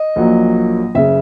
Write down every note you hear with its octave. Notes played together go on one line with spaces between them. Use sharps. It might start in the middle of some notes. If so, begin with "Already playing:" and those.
Already playing: D#5
A#1 A#2 F#3 A#3
F#1 C#3 E5